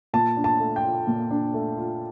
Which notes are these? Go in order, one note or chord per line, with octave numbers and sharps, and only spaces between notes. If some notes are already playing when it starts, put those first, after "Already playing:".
A#2 A5
D4
A5
A3
G5
F4
A#2
D4
A3
F4